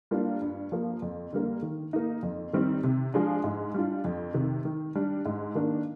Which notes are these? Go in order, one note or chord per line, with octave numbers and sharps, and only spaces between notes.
G3 A#3 D4 F4
G2
F3 A#3
F2
D3 G3 A#3
D#3
A#3 D#4
F2
D#3 G3 C4 D#4
C3
F3 G#3 D4
G#2
G3 D4 F4
F2
C3 D#3
D#3
G3 D4
G#2
D#3 A#3 D4